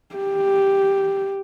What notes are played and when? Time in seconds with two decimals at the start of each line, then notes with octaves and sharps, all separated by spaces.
0.15 G4